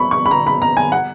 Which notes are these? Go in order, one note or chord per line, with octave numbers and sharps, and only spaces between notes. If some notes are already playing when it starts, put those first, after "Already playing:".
Already playing: B5 C#6
C#6
B5
A#5
B5
A#5
G#5
F#5